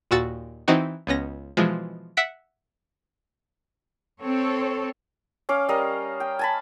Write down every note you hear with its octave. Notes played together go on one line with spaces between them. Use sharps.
D#2 A#2 F#4 E6 A6
E3 C4 D#4 F#4
C#2 B3 C#4 A#6
B2 E3 F3 G#3
E5 F#5 B6 D7
C4 A4 C#5
C#4 F5 D6
G3 A#4 D#5 F5
G5
G#5 A5 B5